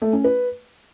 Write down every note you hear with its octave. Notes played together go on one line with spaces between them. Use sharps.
A3
C#4
B4